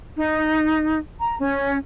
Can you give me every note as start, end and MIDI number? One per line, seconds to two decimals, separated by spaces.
0.16 0.98 63
1.20 1.36 82
1.40 1.78 61